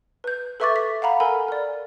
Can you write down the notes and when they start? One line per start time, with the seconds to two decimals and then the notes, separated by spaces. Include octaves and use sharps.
0.24 B4 G6
0.60 A4 B4 E5 C#6 D6 A6
0.76 B6
1.02 F5 F#5 A#5 B5
1.20 A4 A#4 G#5 B5
1.48 A#4 D5